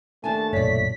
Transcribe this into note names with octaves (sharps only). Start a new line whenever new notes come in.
D#2 A3 D4 G#5 A5
F#1 B1 A#2 C#5 D5 B6